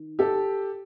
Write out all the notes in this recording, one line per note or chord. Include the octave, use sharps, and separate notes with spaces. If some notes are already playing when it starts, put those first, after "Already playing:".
Already playing: D#3
G4 A4